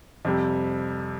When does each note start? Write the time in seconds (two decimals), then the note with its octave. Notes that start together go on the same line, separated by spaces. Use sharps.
0.25 F2 C3 G3